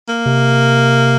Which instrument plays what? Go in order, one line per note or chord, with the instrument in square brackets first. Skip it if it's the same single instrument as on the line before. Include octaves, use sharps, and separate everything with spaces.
[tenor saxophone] A#3
[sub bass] C3